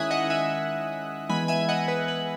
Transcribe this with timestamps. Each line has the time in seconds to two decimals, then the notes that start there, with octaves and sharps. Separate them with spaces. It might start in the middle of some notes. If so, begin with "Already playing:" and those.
Already playing: D#3 G#3 C#4 E4 E5 G#5 D#6 F#6
0.11 D#5 F#5
0.30 E5 G#5
1.29 E3 G#3 B3 G#5 B5
1.48 E5 G#5
1.69 D#5 F#5
1.88 B4
2.08 B4